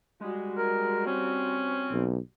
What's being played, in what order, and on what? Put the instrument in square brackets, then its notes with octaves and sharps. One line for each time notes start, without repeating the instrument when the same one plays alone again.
[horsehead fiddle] G3 F#4 [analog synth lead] G#3
[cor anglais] A#4
[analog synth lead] C4 [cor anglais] C#4
[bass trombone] B1